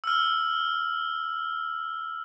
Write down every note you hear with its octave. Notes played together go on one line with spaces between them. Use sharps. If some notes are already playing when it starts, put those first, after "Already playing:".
E6 F6